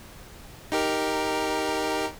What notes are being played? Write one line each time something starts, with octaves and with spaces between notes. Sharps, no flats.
D#4 G4 A#4